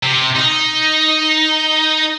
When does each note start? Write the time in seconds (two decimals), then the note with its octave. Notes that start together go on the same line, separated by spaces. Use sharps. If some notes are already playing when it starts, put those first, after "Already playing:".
0.03 C3
0.36 D#4